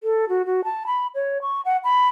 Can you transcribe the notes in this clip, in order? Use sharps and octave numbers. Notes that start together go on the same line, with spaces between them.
A4
F#4
F#4
A5
B5
C#5
C#6
F#5
B5